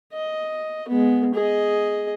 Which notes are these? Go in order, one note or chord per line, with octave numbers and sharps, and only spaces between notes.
D#5
G#3 B3
G#4 D#5